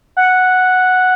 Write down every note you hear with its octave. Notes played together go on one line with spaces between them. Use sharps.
F#5